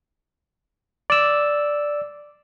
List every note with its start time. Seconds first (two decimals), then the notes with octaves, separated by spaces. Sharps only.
1.10 D5 E6